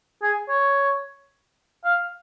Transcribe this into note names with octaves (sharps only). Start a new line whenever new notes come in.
G#4
C#5
F5